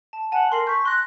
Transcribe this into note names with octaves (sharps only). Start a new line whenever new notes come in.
A5
F#5 G#5 A5
A#4 C6 C7 F#7
C#6 G6 B6
C6 F#6 A#6